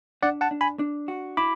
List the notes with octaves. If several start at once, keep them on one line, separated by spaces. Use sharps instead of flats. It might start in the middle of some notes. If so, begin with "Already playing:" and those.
D4 D5 F#5
F#5 A5
D4
G#5 B5
D4
F#4
E4 B5 D6